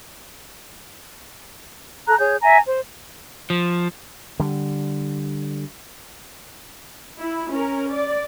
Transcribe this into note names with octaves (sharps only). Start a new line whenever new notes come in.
A4 A#5 F#6
G#4 C#5 G6
E5 G#5 A#5
C5
F3
D3 G3
E4
C#4 A#4
D5